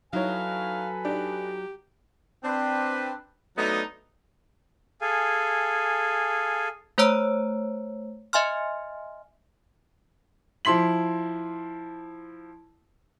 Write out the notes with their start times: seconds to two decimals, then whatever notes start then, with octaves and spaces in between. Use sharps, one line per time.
0.13 F#3 D#4 E4 A4 B4 C#5 F5 G#5
1.05 D4 D#4 G4
2.44 C4 D4 B4
3.57 F#3 A3 B3 D4 D#4
5.01 G#4 A4 F5 G#5
6.98 A3 C5 C#5 A#5 E6 D7
8.33 D#5 E5 G#5 C6 F6
10.65 F3 E4 C6 B6 F#7